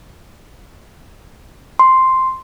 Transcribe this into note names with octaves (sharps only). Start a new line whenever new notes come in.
C6